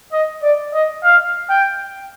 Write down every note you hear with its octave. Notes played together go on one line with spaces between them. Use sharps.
D#5
D5
D#5
F5
G5